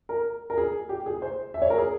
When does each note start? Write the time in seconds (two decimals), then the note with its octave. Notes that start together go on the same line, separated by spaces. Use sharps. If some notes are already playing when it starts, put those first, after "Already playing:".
0.09 A#4
0.50 A#4
0.58 G#4
0.89 G4
1.06 G#4
1.22 C5
1.54 E5
1.62 C#5
1.70 A#4
1.78 G#4